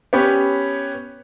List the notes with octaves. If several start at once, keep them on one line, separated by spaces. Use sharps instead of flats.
B3 C#4 G4 B4 C#5